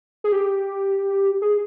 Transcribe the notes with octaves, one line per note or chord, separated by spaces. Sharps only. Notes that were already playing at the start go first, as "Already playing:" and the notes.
G#4
G4
G#4